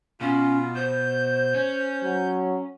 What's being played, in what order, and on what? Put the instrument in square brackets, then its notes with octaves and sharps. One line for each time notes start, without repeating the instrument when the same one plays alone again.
[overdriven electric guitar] B2 [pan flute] C#4 [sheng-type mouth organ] F4
[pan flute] C5 [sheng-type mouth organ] G6
[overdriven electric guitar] C#4
[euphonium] F#3